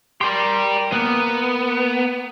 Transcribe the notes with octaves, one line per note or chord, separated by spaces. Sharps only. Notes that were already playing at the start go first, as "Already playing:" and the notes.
G4 A#4 D5 G5 C6
A#3 B3 A#4 B4